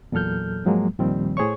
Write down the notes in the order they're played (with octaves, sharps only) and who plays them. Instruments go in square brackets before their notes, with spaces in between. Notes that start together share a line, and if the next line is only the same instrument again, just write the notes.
[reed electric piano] E2 A#2 F#3 A4 F6 G6
G#2 F3 F#3 G#3 A#3
D#2 A#2 D#3 F3 G3 C4
A2 G#4 C5 C#5 C#6